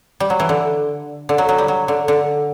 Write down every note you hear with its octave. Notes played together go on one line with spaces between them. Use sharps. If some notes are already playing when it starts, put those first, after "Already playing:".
G3
F#3
E3
D3
D3
F#3
F#3
G3
F#3
D3
D3